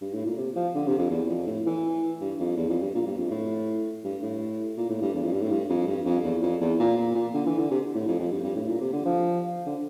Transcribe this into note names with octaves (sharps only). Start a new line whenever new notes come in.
G2
A2
A#2
C3
F3
D3
C3
F2
E2
F2
A2
E3
G2
F2
E2
F2
G2
A#2
G2
F2
A2
G2
A2
A#2
A2
G2
E2
F2
G2
A2
G2
F2
G2
F2
E2
F2
E2
A#2
A#2
A#2
D3
E3
D3
C3
A2
F2
F2
G2
G2
A2
A#2
C3
D3
F3
D3